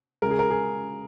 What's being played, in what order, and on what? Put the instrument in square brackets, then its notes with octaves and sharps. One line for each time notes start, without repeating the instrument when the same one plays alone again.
[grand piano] C#3 G#3 A#4
G#4
A#4
G#4